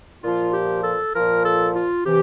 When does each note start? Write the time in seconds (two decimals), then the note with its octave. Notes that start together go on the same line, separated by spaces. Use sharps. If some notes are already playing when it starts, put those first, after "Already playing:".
0.23 A#2 F3 F4
0.53 G4
0.83 A4
1.14 A#2 F3 A#4
1.44 A4
1.75 F4
2.06 C3 E3 G4